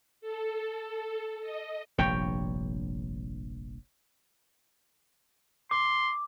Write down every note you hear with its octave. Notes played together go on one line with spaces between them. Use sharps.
A4
D#5
F1 A#1 G2 C#5 G5
C6 D6